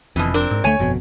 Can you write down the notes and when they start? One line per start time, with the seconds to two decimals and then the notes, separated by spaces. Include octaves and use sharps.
0.16 F1 F2 B2 D3 E3
0.34 C4 D4 A#4
0.51 G#2
0.64 D2 A3 C#5 G#5
0.79 G1 F2 B2